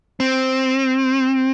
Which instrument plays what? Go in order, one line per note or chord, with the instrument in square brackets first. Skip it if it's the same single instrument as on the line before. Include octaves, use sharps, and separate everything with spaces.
[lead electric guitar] C4